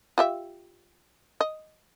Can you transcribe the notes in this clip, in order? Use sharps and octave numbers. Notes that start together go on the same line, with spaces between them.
F4 G4 E5
D#5